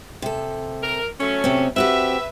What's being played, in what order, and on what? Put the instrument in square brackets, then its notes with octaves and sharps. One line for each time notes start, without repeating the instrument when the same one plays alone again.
[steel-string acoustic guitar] C3 A4
[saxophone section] A#4
[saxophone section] F#3 A3 C#4 [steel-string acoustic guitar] A4
[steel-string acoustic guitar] C3 C4
[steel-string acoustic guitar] C4 F#4 G4 [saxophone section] B4 E5